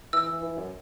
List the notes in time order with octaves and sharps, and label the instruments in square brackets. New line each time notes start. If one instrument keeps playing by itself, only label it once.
[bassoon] E3 [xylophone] E6
[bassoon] E3
E3
F#2